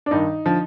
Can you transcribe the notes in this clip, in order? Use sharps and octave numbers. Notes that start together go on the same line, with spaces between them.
D4
G2 D#3 D#4
D3 F3